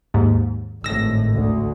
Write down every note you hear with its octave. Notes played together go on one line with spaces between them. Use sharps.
D#2 G#2
G#1 A2 E6 A#6
D2